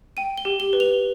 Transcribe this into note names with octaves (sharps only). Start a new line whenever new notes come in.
G5 D#7
G7
G4
G7
B4
F7